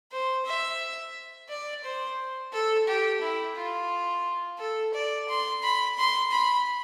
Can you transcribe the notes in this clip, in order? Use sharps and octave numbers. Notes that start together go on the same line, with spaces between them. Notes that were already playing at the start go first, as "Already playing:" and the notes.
C5
E5
D5
C5
A4
G4
E4
F4
A4
D5
C6
B5
C6
B5